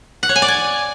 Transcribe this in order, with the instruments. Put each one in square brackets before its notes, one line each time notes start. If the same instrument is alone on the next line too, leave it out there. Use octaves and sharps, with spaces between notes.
[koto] F#5
C#5
G#5
D5
G#5